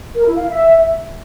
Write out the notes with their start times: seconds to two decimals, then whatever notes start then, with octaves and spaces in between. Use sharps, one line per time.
0.16 A#4
0.26 E4
0.36 F5
0.46 E5